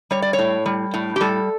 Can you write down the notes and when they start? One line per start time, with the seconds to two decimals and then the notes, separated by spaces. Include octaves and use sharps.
0.11 G3 C#5
0.22 D5
0.33 C#5
0.39 A2
0.66 G3
0.94 A2
1.16 G4
1.21 G3 A4